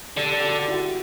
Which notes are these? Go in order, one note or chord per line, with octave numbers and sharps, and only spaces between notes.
D3 G4
G4
F#4
E4
F#4
G4